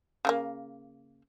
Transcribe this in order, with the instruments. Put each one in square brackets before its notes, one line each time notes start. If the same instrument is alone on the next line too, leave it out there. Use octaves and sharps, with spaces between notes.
[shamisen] C#3 F#3 A#3